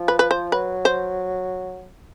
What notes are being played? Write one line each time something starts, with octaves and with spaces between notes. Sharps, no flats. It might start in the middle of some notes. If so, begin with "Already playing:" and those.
Already playing: F3
B4
B4
C5
F#3 B4
C5